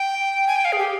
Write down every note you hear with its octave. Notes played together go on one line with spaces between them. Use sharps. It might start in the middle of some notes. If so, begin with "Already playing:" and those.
Already playing: G5
G#5
G5
F5
G#4
G4